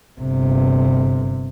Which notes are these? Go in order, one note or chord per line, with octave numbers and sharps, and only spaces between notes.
G1 C3